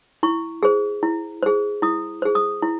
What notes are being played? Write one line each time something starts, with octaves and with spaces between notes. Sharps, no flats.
E4 C#6
G#4 C5
E4
G#4 C5
E4 D#6
G#4 C5
D#6
E4